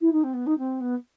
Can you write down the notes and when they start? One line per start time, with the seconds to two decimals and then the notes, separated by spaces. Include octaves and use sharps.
0.01 E4
0.12 D#4
0.23 C4
0.33 B3
0.46 D#4
0.58 C4
0.80 B3